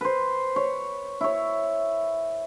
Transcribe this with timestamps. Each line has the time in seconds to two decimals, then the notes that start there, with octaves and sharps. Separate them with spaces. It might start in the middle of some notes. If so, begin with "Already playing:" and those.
0.01 B4 C5
0.56 C#5
1.21 E4 C#5